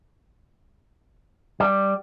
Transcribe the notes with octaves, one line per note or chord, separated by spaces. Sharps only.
G3